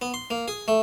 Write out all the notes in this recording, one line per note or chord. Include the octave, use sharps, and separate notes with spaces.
B3
C6
A#3
G#4
A3